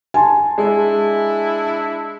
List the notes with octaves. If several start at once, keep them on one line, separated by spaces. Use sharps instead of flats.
G#5 A5 C6
G#3 D4 E4